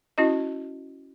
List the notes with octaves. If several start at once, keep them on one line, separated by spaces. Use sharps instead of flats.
C#4 E4 F#4 D#5